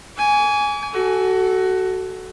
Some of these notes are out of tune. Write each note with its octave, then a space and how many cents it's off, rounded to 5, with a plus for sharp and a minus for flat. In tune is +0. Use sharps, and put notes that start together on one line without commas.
G#5 +0 D6 -45
F#4 +20 A4 -5